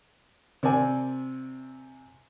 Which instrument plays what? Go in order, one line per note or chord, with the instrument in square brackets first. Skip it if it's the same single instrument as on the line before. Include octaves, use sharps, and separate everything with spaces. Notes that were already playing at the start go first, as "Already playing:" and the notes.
[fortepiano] C3 C4 D5 G#5